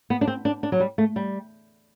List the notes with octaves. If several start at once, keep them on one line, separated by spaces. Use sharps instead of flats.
B3
D4
C4
D4
D4
F#3
G3
A3
G3